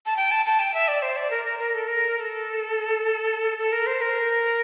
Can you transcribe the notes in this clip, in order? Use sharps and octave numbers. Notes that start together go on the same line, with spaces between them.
A5
G5
A5
A5
G5
E5
D5
C5
D5
A#4
A#4
A#4
A4
A#4
A#4
A4
A4
A#4
C5
A#4